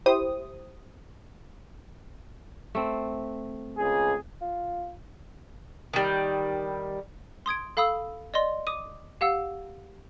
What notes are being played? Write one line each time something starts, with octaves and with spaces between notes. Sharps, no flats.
E4 G4 C5 D#6
A3 C4
C#2 G#4
F4
D#3 G3
C6 D#6 G#6 D7
A4 F5 B5 D#6 E6
D5 D#5 C6
D6 D#6 D#7
G4 F5 F#5 E6